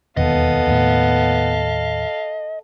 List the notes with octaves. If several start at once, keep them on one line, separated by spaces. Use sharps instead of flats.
E1 D#2 B2 B3 A4 D#5 F5
D#2 A2